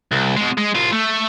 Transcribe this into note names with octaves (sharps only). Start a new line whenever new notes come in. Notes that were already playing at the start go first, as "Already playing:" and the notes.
C2
B2 G#3
G#3
C2 F4
A3